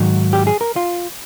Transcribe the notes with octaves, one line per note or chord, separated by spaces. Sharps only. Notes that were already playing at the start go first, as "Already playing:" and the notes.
Already playing: G#2 D#3 F#3
G4
G#4
A#4
F4